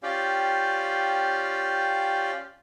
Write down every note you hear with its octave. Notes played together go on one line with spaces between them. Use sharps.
C#4 F4 G4 D5 F5 G5